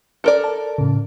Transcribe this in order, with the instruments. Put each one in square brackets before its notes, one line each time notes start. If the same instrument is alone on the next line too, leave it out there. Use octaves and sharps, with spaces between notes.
[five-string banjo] A4 A#4 D5
[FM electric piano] A5
A2 C#3